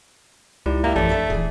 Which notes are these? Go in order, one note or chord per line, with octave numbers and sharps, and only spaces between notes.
C#2 D#4 E4 G4 D5
A#3 G4 E5
A#1 F#2 E3 A3 D5
D4 A4 E5
D#1 E3 G#4